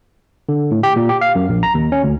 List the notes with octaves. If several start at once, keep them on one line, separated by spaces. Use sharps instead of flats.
D3
A2
G4
A#2
G4
F5
F#2
A#1
A#5
D#2
C#4
D2